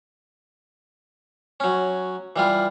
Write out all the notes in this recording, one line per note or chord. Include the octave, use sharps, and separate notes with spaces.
F#3 C#4
E3 G3 F4